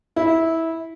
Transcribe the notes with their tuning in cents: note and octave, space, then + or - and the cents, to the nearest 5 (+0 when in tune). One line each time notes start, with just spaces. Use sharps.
E4 -15